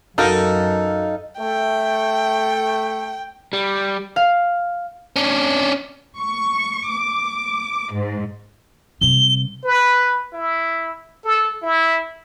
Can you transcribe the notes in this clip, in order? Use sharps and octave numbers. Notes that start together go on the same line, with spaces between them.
F#2 D#4 F#4 A4 A#4 F5
A3 G5
G3
F5
C#4 D4
C#6
D6
G#2
C3 G3 G7
B4
E4
A4
E4